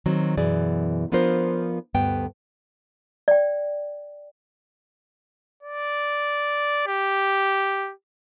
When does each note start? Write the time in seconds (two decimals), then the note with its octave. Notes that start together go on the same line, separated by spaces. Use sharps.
0.06 D#3 F#3 C4
0.37 F#2 B2 E3 G#4 D5
1.12 F3 B3 D4 F4 A#4 C5
1.94 D2 G2 B3 G5
3.28 D5 G5
5.63 D5
6.87 G4